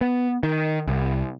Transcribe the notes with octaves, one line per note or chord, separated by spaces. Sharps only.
B3
D#3
C2